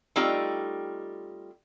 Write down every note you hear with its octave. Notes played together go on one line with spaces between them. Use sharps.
G3 A3 C4 D#4 F4 G4